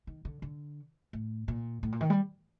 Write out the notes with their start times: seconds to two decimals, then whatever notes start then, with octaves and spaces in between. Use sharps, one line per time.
0.07 D#3
0.25 D3
0.42 D3
1.13 A2
1.48 A#2
1.83 A2
1.92 A#2
2.01 D#3
2.10 G3